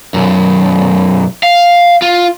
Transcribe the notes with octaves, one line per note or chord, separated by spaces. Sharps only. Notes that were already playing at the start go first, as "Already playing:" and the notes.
B1 F#2
F5
F4